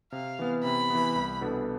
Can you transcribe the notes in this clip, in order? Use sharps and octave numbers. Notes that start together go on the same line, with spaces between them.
C3 F5
E3 B3
C3 B5
E3 B3
C2
B2 B3 D4 A4